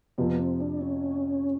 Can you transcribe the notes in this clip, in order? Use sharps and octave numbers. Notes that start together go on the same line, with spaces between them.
F2 C3 F3 B3
C4
D4
C#4